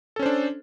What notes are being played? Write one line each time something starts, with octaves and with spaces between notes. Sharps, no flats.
C#4 D4 A4 C5